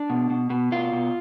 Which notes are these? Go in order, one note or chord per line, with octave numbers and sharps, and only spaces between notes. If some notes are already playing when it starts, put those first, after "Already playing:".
Already playing: D4
B2
B2
B2
B2 F4
B2